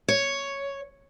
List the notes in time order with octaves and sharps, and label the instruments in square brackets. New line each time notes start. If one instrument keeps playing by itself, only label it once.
[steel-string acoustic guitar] C#5